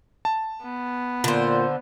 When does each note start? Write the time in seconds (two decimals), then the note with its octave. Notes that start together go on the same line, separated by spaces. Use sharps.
0.25 A5
0.63 B3
1.24 A#2 D3 C5